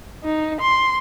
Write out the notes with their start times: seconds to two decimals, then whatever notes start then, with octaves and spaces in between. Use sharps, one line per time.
0.24 D#4
0.61 C6